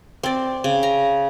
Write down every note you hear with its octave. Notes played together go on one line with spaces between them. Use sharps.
C4 D5
C#3
A#5